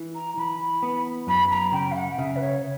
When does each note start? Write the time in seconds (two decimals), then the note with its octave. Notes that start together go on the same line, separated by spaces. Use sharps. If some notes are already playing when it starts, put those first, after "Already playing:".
Already playing: E3
0.14 A#5
0.37 E3 B5
0.83 B3
1.27 F#2 B5
1.50 A#5
1.72 C#3 G5
1.91 E5
1.95 F#5
2.18 C#3 E5
2.36 B4
2.41 C#5